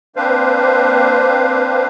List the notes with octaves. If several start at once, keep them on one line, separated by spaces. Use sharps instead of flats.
A#3 C4 D4 B4 C5 F5